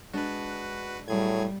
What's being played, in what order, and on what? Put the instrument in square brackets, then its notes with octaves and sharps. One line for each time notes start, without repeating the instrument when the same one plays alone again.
[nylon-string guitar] G#3 D4 [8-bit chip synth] F#4 B4
[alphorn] A2 [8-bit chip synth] F#3 G#4 G#6 [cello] G3